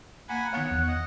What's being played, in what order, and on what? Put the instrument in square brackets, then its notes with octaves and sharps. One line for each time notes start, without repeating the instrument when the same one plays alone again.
[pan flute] A#3 [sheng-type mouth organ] F#5 G#5 B5 [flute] A#5
[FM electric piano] D#3 F5 [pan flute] B3 [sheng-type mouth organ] C#5 [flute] F#6
[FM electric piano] E2
[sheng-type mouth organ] D#5 F#5